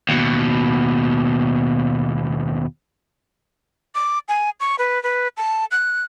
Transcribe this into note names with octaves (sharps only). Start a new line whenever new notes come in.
D#2 B2
D6
G#5
C#6
B4
B4
A5
F#6